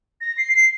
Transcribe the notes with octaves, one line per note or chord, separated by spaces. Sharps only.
A#6
C7
C7